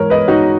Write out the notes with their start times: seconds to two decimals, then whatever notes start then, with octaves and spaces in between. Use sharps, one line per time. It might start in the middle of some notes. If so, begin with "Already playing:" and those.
Already playing: G#2 E3 A#4 C#5
0.10 B4 D#5
0.28 D#4 F#4